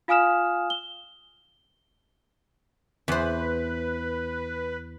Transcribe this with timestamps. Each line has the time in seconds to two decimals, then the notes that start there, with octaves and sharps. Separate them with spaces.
0.08 F4 F5 G#5 D#6 F6 E7
0.70 G7
3.08 E2 B4 C5